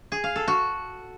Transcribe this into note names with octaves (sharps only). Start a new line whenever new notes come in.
G#4
F5
A4
F#4